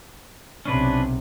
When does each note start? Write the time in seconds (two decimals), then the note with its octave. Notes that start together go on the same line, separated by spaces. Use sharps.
0.65 B1 C3 C#4 D4 B4